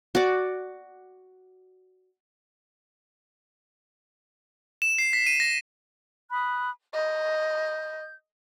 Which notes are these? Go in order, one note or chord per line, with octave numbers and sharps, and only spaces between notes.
F#4 D5
E7
C7
B6
D#7
A#6
B5 D#6 F#6
D#5 G6